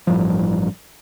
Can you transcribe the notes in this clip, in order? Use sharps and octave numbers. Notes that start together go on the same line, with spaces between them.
A1 G2 F3